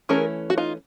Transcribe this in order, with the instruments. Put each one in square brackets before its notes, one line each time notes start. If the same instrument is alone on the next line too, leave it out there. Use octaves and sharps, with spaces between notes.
[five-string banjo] E3 A3 C#4 G#4 A#4
F#4
D#4 F4